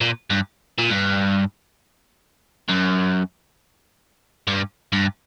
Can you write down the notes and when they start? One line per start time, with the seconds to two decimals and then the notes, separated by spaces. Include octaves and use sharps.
0.01 A#2
0.30 G2
0.79 A#2
0.90 G2
2.69 F#2
4.47 G2
4.93 G2